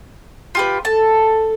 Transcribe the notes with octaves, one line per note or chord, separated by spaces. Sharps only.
F4 G4 B4
A4 A5